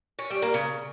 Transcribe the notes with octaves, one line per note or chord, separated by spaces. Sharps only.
C#4
G3
A#3
C#3